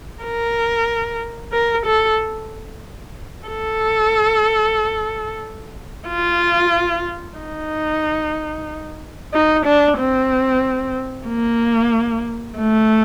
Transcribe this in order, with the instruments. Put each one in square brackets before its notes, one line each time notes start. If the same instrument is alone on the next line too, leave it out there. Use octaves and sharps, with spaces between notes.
[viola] A#4
A#4
A4
A4
F4
D#4
D#4
D4
C4
A#3
A3